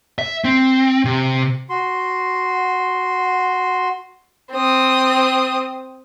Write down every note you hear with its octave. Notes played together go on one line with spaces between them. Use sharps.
E5
C4
C3
F#4 C6
C4 D#6